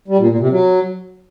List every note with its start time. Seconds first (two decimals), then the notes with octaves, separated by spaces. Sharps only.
0.08 G3
0.18 A#2
0.29 A#2
0.40 C3
0.50 F#3